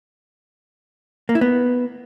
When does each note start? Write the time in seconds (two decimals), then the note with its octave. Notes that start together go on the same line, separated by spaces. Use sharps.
1.29 A#3
1.35 E4
1.41 B3